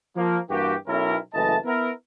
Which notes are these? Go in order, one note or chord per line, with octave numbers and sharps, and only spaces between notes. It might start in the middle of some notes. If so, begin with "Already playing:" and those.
F3 A#3
G2 E3 A#3 F#4 G4
B1 C#4 E4 A#4
F#1 E3 A3 D#5 A5
B3 E4 A#4